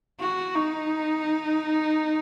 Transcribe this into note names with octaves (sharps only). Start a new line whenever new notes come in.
F#4
D#4